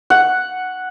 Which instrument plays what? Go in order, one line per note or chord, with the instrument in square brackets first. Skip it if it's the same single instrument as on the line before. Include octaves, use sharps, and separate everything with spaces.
[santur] F#5